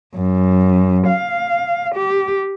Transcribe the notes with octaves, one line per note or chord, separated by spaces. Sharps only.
F#2
F5
G4